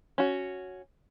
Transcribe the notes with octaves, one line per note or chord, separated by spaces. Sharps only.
C#4 F#4